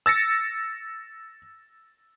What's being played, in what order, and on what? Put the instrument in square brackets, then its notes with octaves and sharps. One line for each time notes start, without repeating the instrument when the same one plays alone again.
[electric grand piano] E6 A6 A#6 C#7